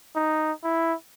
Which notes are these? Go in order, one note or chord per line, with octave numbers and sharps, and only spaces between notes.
D#4
E4